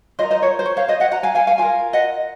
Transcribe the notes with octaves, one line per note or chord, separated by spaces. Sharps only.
F4 A#4 C5 D#5
C5 D#5
C#5
C5
C#5
C#5 F5
C5 D#5
D#5 F#5
F#5 A#5
F5 G#5
F5 G#5
F5 G#5
F4 A#4 F5 G#5
D#5 F#5